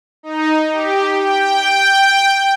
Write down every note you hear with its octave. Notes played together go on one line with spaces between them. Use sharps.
D#4
G4
G5